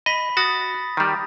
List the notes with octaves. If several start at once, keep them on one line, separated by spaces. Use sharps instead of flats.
D#5 B5 B6
F#4 D#6 A6 A#6
D#3 G3